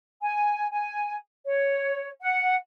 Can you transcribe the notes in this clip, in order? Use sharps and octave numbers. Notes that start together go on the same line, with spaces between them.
G#5
G#5
C#5
F#5